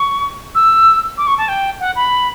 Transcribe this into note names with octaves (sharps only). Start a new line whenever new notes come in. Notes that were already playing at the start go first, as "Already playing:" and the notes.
Already playing: C#6
E6
D6
C#6
A5
G5
F#5
B5